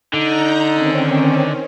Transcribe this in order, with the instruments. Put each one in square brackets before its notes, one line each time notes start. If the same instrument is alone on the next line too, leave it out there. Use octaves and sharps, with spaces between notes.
[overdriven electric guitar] D3 [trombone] D#4 [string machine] A#5 G6 A#6
[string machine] D#3 C4 C#4